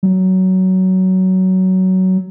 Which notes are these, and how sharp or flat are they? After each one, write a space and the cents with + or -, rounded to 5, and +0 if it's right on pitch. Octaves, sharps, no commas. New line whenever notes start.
F#3 +15